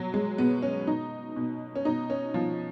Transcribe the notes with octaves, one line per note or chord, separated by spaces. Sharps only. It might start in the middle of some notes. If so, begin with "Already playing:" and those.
Already playing: B2 F#3
G#3
B2 B3
C#4
B2 D#4
B2
C#4
B2 D#4
C#4
B2 F3